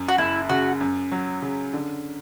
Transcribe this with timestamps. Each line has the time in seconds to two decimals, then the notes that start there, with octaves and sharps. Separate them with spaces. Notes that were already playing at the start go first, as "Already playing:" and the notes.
Already playing: F#2
0.09 F#4
0.18 F#1 E4
0.49 C#3 F#4
0.81 F#2
1.12 F#3
1.42 C#3
1.73 D3